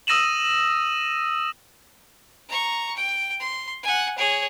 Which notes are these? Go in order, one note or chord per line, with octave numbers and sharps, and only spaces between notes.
D#6 E6 A#6 D#7 E7 F#7
A#5 C#6
G5
C6
F#5 G#5
G#4 C#5